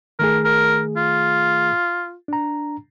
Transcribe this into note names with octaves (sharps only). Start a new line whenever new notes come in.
D#3 A3 G#4 A#4
A#4
F4
D4 A#5